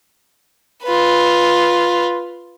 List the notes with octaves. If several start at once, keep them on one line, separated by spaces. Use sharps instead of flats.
F4 B4